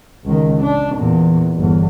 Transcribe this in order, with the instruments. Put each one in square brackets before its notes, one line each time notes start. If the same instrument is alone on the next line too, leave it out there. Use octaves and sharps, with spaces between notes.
[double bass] C#2 D#3
D4
E2 A#2
G1 E2